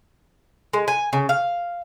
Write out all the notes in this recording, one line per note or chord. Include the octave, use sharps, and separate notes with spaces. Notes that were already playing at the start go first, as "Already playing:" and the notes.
G#3
G#5
C#3
F5